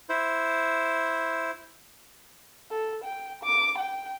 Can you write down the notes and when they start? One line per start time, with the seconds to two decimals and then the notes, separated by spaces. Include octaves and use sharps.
0.09 E4 C5
2.70 A4
3.04 G5
3.44 D6
3.78 G5